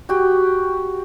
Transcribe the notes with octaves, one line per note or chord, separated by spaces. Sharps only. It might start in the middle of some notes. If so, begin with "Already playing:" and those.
F#4 G4